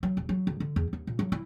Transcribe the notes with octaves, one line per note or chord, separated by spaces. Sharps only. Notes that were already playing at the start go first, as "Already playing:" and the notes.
F#3
D#1
F#3
D2
D3
E2
D#2
A#2
F#3
E4